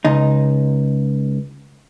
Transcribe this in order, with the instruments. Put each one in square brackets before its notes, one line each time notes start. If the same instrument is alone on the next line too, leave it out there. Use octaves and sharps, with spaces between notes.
[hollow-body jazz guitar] C#2 D#4